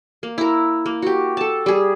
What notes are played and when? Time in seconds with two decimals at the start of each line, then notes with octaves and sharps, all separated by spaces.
0.23 A#3
0.38 E4 A#4
0.86 A#3
1.02 F#4 G4
1.37 A4 A5
1.66 G3 G#4